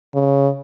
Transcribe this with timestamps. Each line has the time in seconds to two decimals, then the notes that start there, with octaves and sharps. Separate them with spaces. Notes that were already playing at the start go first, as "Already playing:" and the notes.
0.14 C#3